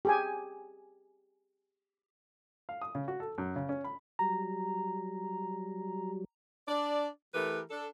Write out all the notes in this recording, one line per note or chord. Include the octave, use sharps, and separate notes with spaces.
G4 G#4 G#5
F5
D#6
C#3
F#4
A4
F#2
C#3
C#4
B5
F#3 G3 A#5
D4 D5
E3 A3 G4 A#4 B4
D4 A4